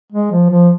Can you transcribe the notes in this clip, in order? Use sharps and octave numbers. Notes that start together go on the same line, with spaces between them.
G#3
F3
F3